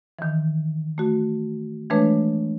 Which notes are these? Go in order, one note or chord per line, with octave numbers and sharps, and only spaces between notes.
D#3 E3
A3 F#4
E3 G#3 A3 D4 B4 C#5